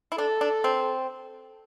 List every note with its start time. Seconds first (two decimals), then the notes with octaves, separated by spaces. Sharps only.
0.12 E4
0.17 D4 A4
0.41 D4
0.64 C4